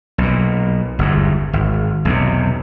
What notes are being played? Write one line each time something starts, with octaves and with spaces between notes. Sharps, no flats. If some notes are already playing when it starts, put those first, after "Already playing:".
B1 A#2
G1 E2 G#2
G#1
B1 E2 C3